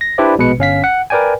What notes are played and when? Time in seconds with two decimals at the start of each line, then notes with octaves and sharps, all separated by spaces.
0.01 A#6
0.18 D4 E4 G4 B4 C5 D5
0.38 A#1 B2 G#3 B4 C#7
0.59 G1 C#4 F5 B6
0.84 F#5
1.10 A#4 B4 D5 G5 G#5